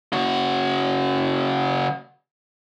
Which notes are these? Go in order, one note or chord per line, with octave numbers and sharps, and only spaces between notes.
C#3 F#4